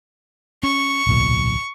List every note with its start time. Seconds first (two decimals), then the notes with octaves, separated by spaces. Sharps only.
0.63 C#4 C#6
1.07 D1 B1 A#2